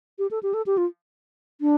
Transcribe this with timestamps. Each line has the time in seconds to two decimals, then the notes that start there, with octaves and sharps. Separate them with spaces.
0.19 G4
0.31 A4
0.43 G4
0.54 A4
0.66 G4
0.78 F4
1.61 D4